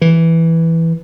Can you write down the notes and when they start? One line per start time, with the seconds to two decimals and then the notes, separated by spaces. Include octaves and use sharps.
0.01 E3